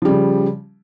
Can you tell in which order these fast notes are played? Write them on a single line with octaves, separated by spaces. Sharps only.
F3 G3 C#3